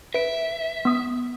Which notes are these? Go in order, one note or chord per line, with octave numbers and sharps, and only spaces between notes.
B4 E5 D7
B3 D#6